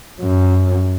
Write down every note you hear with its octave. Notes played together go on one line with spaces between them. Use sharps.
F#2